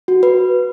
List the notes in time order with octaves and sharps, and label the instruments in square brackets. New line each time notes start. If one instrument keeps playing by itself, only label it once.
[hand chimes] F#4
B4